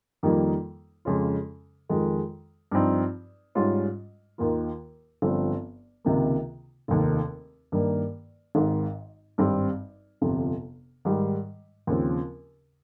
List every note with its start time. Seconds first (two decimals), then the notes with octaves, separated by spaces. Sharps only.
0.23 F2 D#3 G3 A#3 D#4
1.05 F2 C#3 G#3 C#4 F4
1.89 F2 D#3 G#3
2.72 G2 F3 C4 D#4
3.55 G#2 G3 C#4 F4
4.38 D#2 D#3 A#3 F4
5.22 G1 G2 F3 C4
6.05 C#2 C3 D#3 A#3
6.88 F1 D#2 D#3
7.72 G2 D#3 A#3
8.55 G#1 G#2 D#3
9.38 G#1 G2 G3 C4
10.21 G1 F2 C3 F3
11.05 G#2 D#3 G3
11.87 D#2 C#3 F3 C4